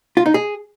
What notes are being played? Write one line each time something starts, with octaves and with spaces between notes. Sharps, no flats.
F4
D#4
G#4